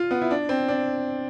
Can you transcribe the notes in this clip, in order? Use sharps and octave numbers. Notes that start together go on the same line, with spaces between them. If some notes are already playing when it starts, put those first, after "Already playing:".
Already playing: F4
B3
E4
D4
C4
D4